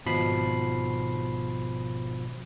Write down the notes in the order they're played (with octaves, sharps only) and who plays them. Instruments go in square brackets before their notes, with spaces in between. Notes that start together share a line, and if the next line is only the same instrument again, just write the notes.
[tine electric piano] G#1 B2 F3 B5 C7